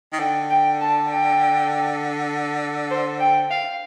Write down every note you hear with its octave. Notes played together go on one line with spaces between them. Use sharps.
D#3
D3 G5
G5
A5
G5
C5
G5
F5